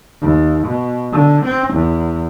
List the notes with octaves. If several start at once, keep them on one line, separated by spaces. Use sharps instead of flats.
D#2
B2
D3
C4
E2